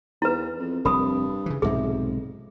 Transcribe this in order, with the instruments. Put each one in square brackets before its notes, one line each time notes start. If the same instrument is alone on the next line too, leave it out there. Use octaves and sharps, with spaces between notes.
[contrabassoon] E2 [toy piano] E4 B4
[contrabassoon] F2
[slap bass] F1 C4 [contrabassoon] G2 [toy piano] A#4 B5 D#6
[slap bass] C#3 E3
[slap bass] B1 G#2 C3 [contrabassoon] F2 [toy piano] G#4 E5